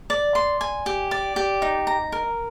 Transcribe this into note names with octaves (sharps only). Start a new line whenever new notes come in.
D5
C6
G#5
G4
D5
G4
D#4
A#5
A#4